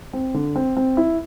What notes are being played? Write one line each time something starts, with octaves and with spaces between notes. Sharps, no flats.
C4
D3
C4
C4
E4